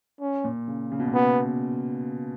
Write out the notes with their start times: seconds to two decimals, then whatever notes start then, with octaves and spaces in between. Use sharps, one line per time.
0.21 C#4
0.44 A#2
0.68 C#3
0.92 C#3
0.99 B2
1.07 A#2
1.14 B2 B3